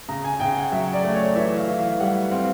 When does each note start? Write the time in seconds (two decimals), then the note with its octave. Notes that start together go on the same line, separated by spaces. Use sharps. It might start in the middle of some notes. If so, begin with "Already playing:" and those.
0.08 C#3 A#5
0.24 G#5
0.40 C#3 G5
0.57 F#5
0.72 F#3 E5
0.93 D5
1.04 A3
1.14 C#5
1.35 E3 E5
1.57 F5
1.68 E3
1.79 F5
2.00 G3 F#5
2.31 C4 F5